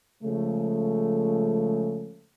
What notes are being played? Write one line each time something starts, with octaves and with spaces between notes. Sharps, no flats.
C#3 F3 G#3 A3